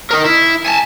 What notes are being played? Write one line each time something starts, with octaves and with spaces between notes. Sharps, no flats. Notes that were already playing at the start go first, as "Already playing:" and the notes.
D#4 A#4
E4
G#5 A5